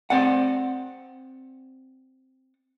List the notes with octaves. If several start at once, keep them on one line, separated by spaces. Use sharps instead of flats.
C4 D5 F#5